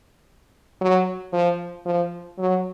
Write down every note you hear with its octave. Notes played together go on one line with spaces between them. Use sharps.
F#3
F3
F3
F#3